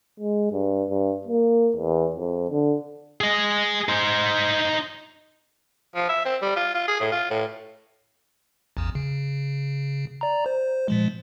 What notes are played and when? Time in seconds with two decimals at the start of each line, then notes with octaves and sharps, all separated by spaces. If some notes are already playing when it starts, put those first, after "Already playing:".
0.20 G#3
0.53 G2
0.90 G2
1.27 A#3
1.77 E2
2.16 F2
2.51 D3
3.21 G#4 D#5
3.89 D#4 C5
5.95 F3
6.09 E5
6.25 C4
6.42 G3
6.56 F4
6.74 F4
6.88 G#4
7.00 A2
7.12 F4
7.30 A2
8.77 A1 E2
8.95 C#3
10.21 D5 A#5
10.46 C5
10.88 A#2 F3 G#3